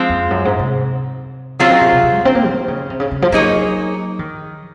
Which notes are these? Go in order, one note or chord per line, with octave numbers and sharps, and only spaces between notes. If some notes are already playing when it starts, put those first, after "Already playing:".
Already playing: F3 G#3 C4
F2
F#2
G#2
C3
C#3 F#3 C4 F4 G#4
D#3
C3
C3
C3
G#3
C4
A#3
D#3
C#3
C3
C#3
C#3
F3
F#3 A#3 D#4 G#4 C#5
D#3